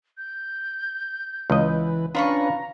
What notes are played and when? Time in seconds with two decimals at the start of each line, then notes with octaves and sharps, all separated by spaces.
0.17 G6
1.50 C#2 E3 B4 D#5
2.15 C#4 D4 F4 B4 A#5 B5 C#6